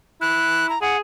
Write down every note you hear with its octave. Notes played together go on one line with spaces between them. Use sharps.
E4 F#6
A#5
G#4 F#5